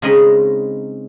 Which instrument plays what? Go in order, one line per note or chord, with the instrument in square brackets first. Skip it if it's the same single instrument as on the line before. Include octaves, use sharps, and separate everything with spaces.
[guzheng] C#3 G#3 C4 D#4 D#5 B5